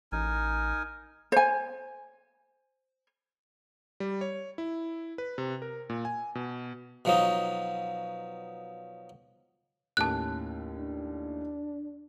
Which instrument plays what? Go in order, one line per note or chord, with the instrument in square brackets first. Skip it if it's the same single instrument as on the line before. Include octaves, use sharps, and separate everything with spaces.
[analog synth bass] A1 [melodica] D#4 A#4 G#5
[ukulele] C5 G#5
[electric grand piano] G3
C#5
E4
B4
C3
A#4
A#2
G#5
B2
[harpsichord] B2 F3 F#3 D#4
[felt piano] D#2 A2 C#4 [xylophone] A5 F#6
[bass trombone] D4